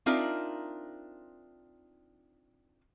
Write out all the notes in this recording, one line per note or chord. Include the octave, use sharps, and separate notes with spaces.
C4 D4 D#4 F4 A#4 E5